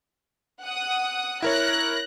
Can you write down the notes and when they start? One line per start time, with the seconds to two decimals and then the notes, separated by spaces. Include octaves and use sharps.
0.63 F#5 D#6
1.42 E4 A#4 C#5 F#6 A#6